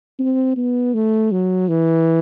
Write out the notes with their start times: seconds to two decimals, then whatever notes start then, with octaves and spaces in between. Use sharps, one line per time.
0.19 C4
0.57 B3
0.94 A3
1.31 F#3
1.68 E3